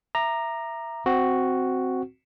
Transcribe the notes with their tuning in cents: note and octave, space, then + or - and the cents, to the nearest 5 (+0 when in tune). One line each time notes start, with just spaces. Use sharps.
E5 +10 A#5 +0 D6 +30
C4 -5 F#4 +0